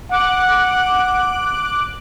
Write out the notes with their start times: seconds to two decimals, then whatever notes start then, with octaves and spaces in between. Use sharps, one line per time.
0.11 F#5 D6 F#6